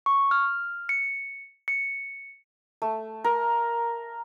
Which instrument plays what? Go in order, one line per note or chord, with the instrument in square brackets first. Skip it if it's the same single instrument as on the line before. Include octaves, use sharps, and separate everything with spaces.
[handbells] C#6
F6
C#7
C#7
[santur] A3
A#4